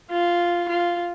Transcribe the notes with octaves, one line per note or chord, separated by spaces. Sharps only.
F4
F4